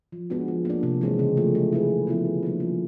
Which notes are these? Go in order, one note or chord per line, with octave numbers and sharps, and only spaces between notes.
F3
G#3 B3 D4 F#4
F3
A#3 D4
C3
E3 G#3 C4
C#3
F3 A3
G#3
C4 E4 G#4 B4
C3
F3 G#3 B3 E4
D3
G3 A#3 D4
F3